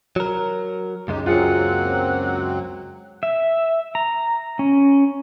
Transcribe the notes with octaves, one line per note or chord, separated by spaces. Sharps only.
F#3 A#4
C#2 F#2 C3 G#3 D#4 G4
F#3 A#3 C4 F4 G#4 F#5
E5
A#5
C#4